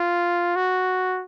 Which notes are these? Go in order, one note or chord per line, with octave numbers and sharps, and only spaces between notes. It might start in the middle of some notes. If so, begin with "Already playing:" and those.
Already playing: F4
F#4